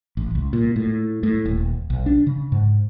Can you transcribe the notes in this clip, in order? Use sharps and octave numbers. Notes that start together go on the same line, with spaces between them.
A1
C#2
A#2
A2
A2
D#1
B1
D4
C#3
G#2